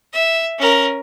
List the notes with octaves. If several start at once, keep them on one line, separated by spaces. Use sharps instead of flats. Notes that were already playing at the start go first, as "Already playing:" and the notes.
E5
C#4 A#4